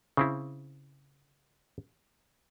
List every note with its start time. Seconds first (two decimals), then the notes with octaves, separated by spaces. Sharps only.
0.17 C#3 C4 E4